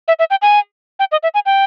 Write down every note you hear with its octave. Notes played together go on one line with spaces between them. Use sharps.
E5
E5
G5
G#5
G5
D#5
E5
G#5
G5